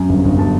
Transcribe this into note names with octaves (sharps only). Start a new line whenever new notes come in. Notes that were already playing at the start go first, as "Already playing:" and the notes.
Already playing: F#2
G1
G1
F#3 A5